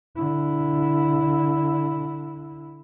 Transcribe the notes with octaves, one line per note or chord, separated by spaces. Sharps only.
D3 E4